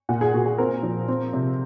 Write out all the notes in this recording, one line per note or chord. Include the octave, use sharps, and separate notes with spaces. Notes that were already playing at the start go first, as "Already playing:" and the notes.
A#2 F#5
G#4
A#2 F#4
G#4
C4 A#4
F3
C4
C3